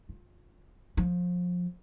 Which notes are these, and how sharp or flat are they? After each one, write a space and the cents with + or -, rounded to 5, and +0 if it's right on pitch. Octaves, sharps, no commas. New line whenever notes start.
F4 +20
F3 +25